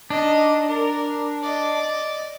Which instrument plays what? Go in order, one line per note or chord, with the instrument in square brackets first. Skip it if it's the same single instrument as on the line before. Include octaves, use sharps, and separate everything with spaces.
[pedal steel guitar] D4 [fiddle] D#4 D#5
[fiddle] A#4
D5 D#5